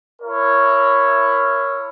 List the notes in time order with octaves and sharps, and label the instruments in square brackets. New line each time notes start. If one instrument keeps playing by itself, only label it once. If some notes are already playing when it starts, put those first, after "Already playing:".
[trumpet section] E4 A#4 C#5